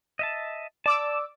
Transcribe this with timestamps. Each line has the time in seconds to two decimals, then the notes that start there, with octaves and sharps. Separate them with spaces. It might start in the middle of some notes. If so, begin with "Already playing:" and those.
0.19 D#5 E5 A5
0.86 D5 A5 D6 E6